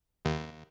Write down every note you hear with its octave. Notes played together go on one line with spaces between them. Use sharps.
D#2